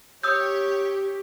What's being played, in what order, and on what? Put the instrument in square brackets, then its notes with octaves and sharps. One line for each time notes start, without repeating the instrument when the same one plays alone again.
[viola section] G4 [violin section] C#5 [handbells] D#6 E6 G6